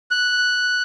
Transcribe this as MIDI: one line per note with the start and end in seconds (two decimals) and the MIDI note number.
0.11 0.83 90